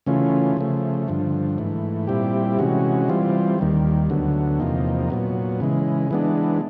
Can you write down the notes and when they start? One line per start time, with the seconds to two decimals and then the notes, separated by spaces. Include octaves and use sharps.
0.06 C#3 E3 A3 C#4 F4
0.57 C#3 F3 A3
1.08 G2 D3 F3
1.58 G#2 E3 A3
2.07 A#2 G3 C4 E4 G4
2.59 C3 E3 G#3 C#4 F#4
3.08 E3 G3 C4 F4
3.59 D#2 D#3 G3
4.10 D2 D3 F#3 B3
4.60 E2 C3 F3 A#3 D#4
5.10 A#2 F#3 B3
5.60 C#3 E3 G#3
6.11 E3 G#3 B3 D4